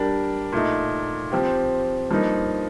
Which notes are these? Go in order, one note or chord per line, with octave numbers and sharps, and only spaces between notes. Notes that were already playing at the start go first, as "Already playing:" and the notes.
Already playing: G3 D4 G4 A#4
A#2 A3 D#4
F3 C4 G4
G2 F3 A#3 D#4